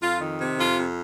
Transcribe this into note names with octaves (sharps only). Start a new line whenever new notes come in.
F2 F4
D#3
C3
F2 F4
F2